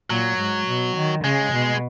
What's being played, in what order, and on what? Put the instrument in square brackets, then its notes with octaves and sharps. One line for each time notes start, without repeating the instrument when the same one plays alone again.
[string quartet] A#2 [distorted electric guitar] F#3
[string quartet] G#2
B2
D#3
[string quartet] C#3 [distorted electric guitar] G#3
[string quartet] B2